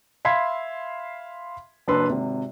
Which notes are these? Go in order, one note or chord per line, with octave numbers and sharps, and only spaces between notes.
E5 F5 B5 C6 G#6 B6
F#1 D4 B4 C6 E6
G#1 C3